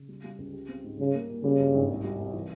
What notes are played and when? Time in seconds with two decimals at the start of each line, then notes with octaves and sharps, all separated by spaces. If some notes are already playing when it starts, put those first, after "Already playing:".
Already playing: C#3
0.09 G3
0.24 G3
0.38 C#2
0.53 G4
0.69 C4
0.84 G#2
0.99 C#3 G3
1.14 A#3
1.30 A#2
1.43 C#3 G3
1.59 G2
1.75 G#1
1.89 C2
2.04 G3
2.20 C2
2.34 E3